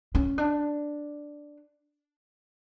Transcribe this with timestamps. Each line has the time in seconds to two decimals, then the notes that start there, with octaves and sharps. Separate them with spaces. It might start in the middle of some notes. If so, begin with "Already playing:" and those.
0.15 C#4
0.38 D4